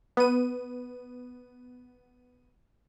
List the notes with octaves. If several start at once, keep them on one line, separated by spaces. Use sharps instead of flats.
B3 D#7